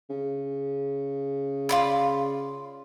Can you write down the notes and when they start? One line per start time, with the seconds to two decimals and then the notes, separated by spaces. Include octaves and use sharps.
0.09 C#3
1.69 F4 D5 B5